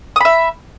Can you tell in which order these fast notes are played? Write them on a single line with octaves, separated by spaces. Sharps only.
D#6 B5 E5